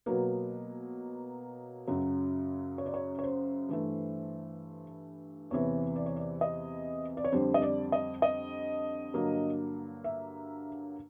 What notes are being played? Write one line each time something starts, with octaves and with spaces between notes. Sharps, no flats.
B2 F#3 A#3 B4
F#2 C#3 F#3
C#5
D5
C#5
C#5
C5
G2 E3 A3
E2 C3 E3 C#5
D5
C#5
D5
D#5
D5
C#5
F2 D3 G3 C5
D#5
D5
D#5
D#5
G2 D3 F#3 A#3
E5